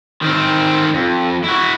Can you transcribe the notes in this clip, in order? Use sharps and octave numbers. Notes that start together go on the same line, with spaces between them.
D#3 C4
F2
E4 F#4